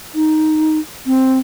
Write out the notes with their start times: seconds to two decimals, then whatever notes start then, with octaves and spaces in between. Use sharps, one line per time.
0.15 D#4
1.07 C4